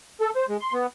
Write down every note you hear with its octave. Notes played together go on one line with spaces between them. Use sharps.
A4
C5
G#3
C6
B3